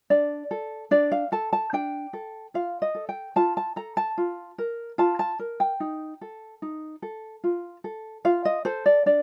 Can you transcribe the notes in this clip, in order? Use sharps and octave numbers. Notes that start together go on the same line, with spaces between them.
D4 D5
A4
D4 D5
F5
A4 A5
A5
D4 G5
A4
F4 F5
D#5
A4
G5
F4 A5
A5
A4 A#5
A5
F4
A#4
F4 A5
A5
A#4
G5
D#4
A4
D#4
A4
F4
A4
F4 F5
D#5
A4 C5
D5
D4 D5